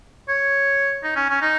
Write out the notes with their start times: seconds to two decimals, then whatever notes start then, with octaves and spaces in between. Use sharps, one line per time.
0.28 C#5
1.04 D#4
1.16 C#4
1.29 C#4
1.41 D#4